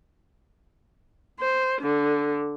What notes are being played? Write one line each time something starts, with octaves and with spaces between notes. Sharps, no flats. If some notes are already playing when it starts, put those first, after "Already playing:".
C5
D3